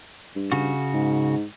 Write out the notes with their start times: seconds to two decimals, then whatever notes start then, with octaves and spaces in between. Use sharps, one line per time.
0.36 G2
0.52 C#3 F#4
0.94 G#2